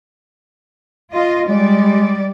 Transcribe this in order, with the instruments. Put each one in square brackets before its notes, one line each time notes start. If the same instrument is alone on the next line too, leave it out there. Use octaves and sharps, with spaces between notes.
[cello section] F4 D#5
[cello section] G3 D5 [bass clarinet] G#3